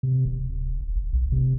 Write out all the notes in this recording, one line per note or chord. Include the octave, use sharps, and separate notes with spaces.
C3
D1
D#1
F1
B1
C3